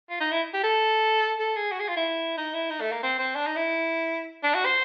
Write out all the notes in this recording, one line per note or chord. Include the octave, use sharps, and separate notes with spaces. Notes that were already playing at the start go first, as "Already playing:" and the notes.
F4
D#4
E4
G4
A4
A4
G#4
F#4
G#4
F4
E4
D#4
E4
D#4
A3
A#3
C4
C4
D4
D#4
E4
D4
F#4
C5